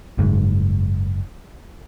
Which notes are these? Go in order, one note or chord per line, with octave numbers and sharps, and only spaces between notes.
F#1 G#2